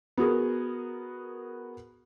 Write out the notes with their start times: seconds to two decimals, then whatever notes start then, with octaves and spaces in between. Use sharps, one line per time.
0.17 B3 F#4 G#4 A#4